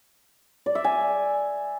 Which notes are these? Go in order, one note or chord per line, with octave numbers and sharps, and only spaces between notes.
D5
E5
G#5